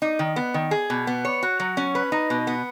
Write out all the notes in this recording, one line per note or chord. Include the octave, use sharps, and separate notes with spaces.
D#4
D#3
B3
D#3
G#4
B2
B3
C#5
F#4
F#3
C#4
B4
D#4
B2
B3